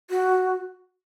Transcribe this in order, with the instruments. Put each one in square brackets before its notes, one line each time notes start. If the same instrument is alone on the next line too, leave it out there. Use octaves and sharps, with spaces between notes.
[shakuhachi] F#4